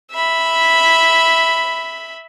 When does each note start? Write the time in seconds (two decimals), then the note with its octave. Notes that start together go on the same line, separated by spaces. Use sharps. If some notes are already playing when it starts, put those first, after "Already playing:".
0.12 E5 B5